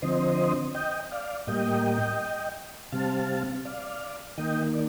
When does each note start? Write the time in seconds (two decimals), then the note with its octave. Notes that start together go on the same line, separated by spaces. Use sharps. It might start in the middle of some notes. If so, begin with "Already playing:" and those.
0.02 D3 F3 C4 C5 D#5
0.75 D#5 G5
1.11 D5 F5
1.47 A2 G3 A#3 D#5 G5
2.92 C3 G3 C4 F5 A5
3.65 D5 F5
4.37 D#3 A#3 D#5 G5
4.74 D5